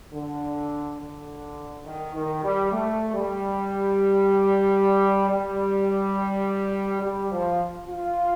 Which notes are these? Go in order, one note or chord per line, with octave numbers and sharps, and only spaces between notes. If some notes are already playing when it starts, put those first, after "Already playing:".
D3
D3
D#3
D#3
G3
A3
G3
G3
G3
F3
F4